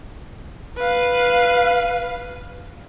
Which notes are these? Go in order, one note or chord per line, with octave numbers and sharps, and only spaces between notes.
B4 F5